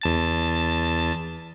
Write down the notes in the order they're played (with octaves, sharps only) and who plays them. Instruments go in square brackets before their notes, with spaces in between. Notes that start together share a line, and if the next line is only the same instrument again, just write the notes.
[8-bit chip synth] E2 A5 A6